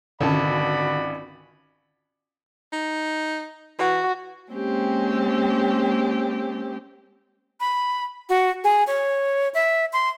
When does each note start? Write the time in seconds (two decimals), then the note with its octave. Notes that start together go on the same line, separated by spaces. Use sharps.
0.21 G#1 C#2 D3 F#4 D5 A5 B5
2.72 D#4
3.79 E3 F#4
4.51 G#3 A#3 C4 C#4 G4
7.60 B5
8.29 F#4
8.64 G#4
8.87 C#5
9.54 E5
9.93 C6